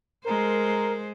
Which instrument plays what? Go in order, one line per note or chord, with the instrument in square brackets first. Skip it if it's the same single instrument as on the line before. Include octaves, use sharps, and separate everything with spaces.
[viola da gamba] G#3 C5 [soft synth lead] A#4